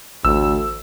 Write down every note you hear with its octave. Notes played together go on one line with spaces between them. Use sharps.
A1 D2 E6